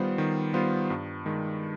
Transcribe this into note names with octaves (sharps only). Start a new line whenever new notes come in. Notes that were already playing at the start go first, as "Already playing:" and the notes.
Already playing: D#3 G3 B3 F4 C5
D#3
G3 B3 F4 C5
G2
D#3 G#3